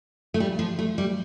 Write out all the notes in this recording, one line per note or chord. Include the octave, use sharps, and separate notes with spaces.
A3
G3
F3
A3
G3